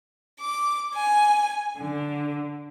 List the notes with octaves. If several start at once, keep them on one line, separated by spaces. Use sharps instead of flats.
D6
G#5
D3